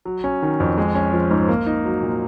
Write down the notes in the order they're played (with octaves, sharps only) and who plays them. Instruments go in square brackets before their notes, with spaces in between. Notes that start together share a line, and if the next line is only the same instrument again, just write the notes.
[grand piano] F#3
C#4
D#3
F2
G#3
C#4
F3
G#2
A#3
D#4
F#3
A#2